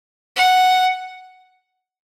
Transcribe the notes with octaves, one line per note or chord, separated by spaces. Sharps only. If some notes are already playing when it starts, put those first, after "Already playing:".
F#5